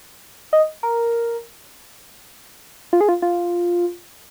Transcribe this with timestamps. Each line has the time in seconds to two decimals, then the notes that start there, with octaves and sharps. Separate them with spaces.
0.53 D#5
0.83 A#4
2.93 F4
3.01 G#4
3.09 F4
3.22 F4